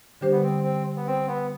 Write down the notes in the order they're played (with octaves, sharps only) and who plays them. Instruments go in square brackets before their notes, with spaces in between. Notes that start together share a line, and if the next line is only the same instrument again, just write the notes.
[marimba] D3 G3 D4 G4 C5
[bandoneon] B3
C4
C4
B3
C4
B3